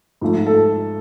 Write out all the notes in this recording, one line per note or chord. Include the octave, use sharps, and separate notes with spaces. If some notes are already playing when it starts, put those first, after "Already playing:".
G#2 F3 A3
A4